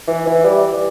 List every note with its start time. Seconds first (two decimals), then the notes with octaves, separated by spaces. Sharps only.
0.08 E3
0.27 E3
0.45 G3